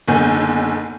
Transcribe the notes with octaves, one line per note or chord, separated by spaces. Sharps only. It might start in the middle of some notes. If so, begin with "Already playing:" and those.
F#1 B1 D3 G#5 G6